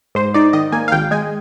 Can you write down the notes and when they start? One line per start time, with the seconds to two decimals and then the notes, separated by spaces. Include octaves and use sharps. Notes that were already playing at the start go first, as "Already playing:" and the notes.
0.15 G#2 C5
0.34 D#4 D5
0.53 D#3 D#5
0.72 A#3 G#5
0.88 F5
0.92 G#1 G5
1.11 G#3 G#5